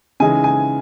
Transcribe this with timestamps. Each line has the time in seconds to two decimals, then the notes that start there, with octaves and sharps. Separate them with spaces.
0.20 C#3 E3 G#3 D#4 G#5
0.44 G#5